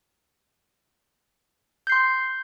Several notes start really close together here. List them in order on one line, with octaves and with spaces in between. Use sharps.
G6 C7 C6